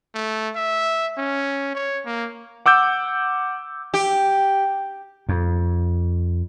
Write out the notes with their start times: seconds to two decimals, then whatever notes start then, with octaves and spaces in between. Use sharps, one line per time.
0.15 A3
0.56 E5
1.18 C#4
1.75 C#5
2.06 A#3
2.66 F#5 D6 E6 G6
3.94 G4
5.29 F2